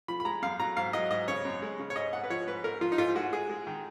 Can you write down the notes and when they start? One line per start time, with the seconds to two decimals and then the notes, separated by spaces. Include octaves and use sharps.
0.08 F3 B5
0.20 B5
0.25 G#3 A#5
0.42 F#2 F5
0.60 F#3 A#5
0.77 G#2 F5
0.93 F#3 D#5
1.11 G#2 D#5
1.28 C#3 C#5
1.45 F#2
1.62 G#3
1.80 C#3
1.90 C#5
1.96 G#2 D#5
2.13 G#2 F#5
2.24 B4
2.30 F3 C#5
2.47 G#2 B4
2.64 G#2 A#4
2.81 F3 F4
2.92 D#4
2.98 G#2 F4
3.15 G#3 F#4
3.33 G#3 G#4
3.49 G#3
3.67 D#3